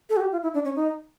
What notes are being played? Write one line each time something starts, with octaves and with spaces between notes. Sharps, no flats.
A4
F#4
G4
F4
E4
D4
C#4
D#4